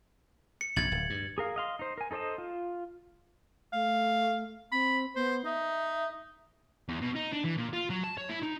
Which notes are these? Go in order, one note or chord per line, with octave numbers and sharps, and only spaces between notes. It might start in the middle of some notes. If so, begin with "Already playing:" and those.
C#7
A#1 F#2 C3 G#6 A6 F#7
D1
G2
G#4 A#4 F5
D#5 F5 C6
D#4 C5
A#4 G#5
D#4 A4 C5 D#5 A5
F4
A3 F5
C4 B5
B3 C5
D#4 E5
E2
B2
D#4
D4
E3
A#2
F4
F#3
A5
C#5
E4
D#4